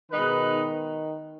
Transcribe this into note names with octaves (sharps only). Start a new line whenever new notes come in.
B2 D#3 G#3 D#4 B4